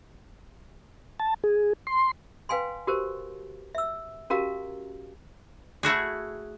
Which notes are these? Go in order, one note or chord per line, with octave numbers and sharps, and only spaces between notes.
A5
G#4
C6
B4 F5 G5 G#5 C6
F#4 G4 A#4 C5
E5 E6
C#4 F#4 G4 A#4 F5 A#5
A3 E4 F#4 G#4